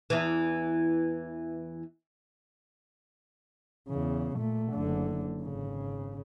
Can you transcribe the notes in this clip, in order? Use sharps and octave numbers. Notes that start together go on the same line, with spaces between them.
E2 E3
E2 C#3
A#2 A3
F#1 D3
G#1 C#3